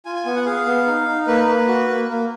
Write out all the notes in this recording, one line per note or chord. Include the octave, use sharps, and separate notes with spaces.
F4 G#5
G#5
B3 G#5
F#5
G#4 F5
B3
D#4
D#4
A#3 B4
A#3
F#4
A#3
A#3